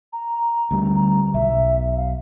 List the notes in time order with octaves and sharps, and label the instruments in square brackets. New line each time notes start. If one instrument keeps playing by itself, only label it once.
[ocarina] A#5
[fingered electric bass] D2 G3
[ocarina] A#5
[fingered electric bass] B1 [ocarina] E5
[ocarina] F5